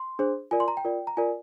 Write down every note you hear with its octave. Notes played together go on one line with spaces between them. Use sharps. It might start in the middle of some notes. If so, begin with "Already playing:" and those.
Already playing: C6
D4 G#4 C5
F4 A#4 D5 G#5
C6
A#5
G5
F4 A#4 D5
A#5
F4 A#4 D5 G#5